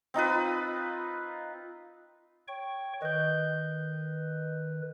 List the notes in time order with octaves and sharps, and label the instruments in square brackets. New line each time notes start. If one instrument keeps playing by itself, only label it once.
[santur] C4 D#4 F4 B4
[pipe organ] C#5 G5 C#6
[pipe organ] D#3 B4 [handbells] D#5 G6